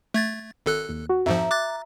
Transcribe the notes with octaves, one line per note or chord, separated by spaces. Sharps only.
A3 G#6 A6
G#1 A4 F#6
D#2
F#4
F2 G#2 F3 E5 A#5
D6 F#6 A6